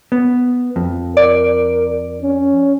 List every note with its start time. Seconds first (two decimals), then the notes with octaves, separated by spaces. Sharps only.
0.12 B3
0.76 F2
1.17 A#4 D5
2.22 C#4